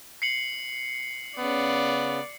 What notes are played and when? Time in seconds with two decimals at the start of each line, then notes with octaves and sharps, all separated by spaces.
0.22 C7 C#7 F#7
1.38 C#3 B3 D5